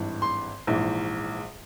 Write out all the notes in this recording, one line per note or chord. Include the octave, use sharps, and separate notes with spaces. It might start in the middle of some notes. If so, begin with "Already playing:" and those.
Already playing: G#1 G2 E3
C6
A#1 G#2 E3